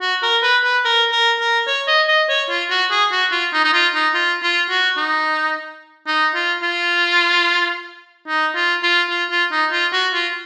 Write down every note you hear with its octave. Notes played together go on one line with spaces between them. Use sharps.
F#4
A#4
B4
B4
A#4
A#4
A#4
C#5
D#5
D#5
C#5
F4
F#4
G#4
F#4
F4
D#4
D#4
F4
D#4
F4
F4
F#4
D#4
D#4
F4
F4
D#4
F4
F4
F4
F4
D#4
F4
F#4
F4